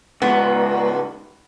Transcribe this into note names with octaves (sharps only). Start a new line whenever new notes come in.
C#2 G#2 B3